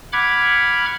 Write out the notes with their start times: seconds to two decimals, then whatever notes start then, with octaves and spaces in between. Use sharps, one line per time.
0.13 F#5 B5 D6 F6 G#6